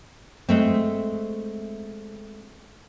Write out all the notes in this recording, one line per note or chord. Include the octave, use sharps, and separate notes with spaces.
G#3 A3 C4